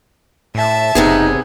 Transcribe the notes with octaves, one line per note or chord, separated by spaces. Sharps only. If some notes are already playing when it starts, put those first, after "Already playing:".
A2 E5 A5
F#1 C3 B3 D#4 G#4